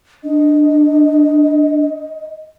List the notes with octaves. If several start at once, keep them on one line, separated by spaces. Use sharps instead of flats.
D4 D#5